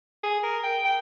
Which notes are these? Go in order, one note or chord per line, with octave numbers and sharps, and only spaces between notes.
G#4
A#4
G5
G5